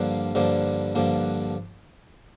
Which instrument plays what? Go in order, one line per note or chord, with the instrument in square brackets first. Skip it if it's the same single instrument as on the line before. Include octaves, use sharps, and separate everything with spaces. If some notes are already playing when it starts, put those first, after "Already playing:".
Already playing: [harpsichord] G2 D3 F3 A#3 D4 F5
G2 D3 F3 A#3 D4
G2 D3 F3 A#3 D4